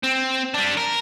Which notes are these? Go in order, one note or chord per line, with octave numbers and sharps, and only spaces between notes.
C4
G3 D4
A#4